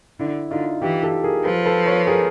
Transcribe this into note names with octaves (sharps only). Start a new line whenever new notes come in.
D3 E4
D3 D#4 F4
E3 F4 G4
G4 A4
G#4 A#4
F3 A4 B4
A4 B4
B4 C#5
G#4 A#4